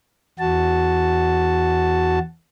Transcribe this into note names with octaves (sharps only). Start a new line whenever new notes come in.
E2 F#4 A5